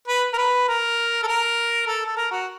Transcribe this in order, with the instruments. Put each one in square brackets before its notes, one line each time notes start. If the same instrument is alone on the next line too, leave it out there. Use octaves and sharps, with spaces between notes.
[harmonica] B4
A#4
B4
A#4
A4
A#4
A4
A4
A#4
F#4